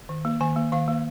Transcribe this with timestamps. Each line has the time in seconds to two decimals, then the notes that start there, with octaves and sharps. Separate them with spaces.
0.09 D#3
0.25 A#3
0.40 D#3 G#5
0.56 A#3
0.72 D#3 F5
0.88 A#3